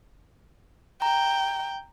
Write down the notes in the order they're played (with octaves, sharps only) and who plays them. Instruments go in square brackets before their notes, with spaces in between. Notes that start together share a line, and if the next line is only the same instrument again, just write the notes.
[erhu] G5 [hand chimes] A#5